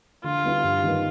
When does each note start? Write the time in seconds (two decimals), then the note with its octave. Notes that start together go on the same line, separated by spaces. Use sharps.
0.24 D3 F4
0.44 G3 B3 E4
0.64 G2
0.84 D#3 G3 B3